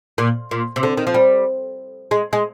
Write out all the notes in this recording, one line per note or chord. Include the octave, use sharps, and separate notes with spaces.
A#2
A#2
C3
D3
D#3
F3
G3
G#3
G#3